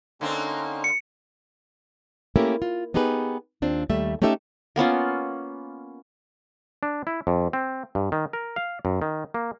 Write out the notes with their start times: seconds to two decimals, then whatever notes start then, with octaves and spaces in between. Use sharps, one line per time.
0.21 D3 A#3 C4 C#4 D#4
0.84 C#7
2.36 A3 A#3 C#4 E4 G4 A#4
2.62 F4
2.94 B3 D#4 G4 G#4 B4
3.62 D#2 C4 D4 F4
3.89 D#2 G3 A3 E5
4.22 A3 C#4 D#4 G4 A4 E5
4.76 A#3 B3 C#4 F4
6.83 D4
7.07 E4
7.27 F2
7.53 C4
7.95 G2
8.12 D#3
8.33 A#4
8.56 F5
8.85 F#2
9.02 D#3
9.34 A#3